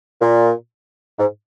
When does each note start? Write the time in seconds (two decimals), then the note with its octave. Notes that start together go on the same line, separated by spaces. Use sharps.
0.21 A#2
1.19 G#2